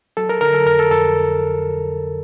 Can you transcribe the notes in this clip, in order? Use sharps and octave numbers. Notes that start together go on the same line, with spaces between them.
F#3 A4
A#4
D3 A#4
A4
F2 A#4
A4
F2 A4